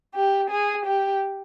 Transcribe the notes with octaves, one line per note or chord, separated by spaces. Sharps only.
G4
G#4
G4